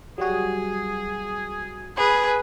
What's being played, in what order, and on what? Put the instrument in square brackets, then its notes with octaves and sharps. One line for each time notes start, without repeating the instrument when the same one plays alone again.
[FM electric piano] F#3 G3 F#4 [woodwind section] G#4
[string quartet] G#4 [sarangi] B4